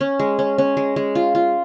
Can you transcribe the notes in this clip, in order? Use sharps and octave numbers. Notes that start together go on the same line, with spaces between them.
C#4
G#3
C#4
C#4
G#3
G#3
F4
F4